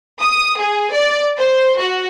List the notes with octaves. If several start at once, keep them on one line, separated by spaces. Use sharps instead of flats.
D#6
G#4
D5
C5
F#4